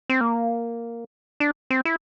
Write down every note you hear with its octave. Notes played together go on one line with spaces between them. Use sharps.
C4
A#3
D4
C4
E4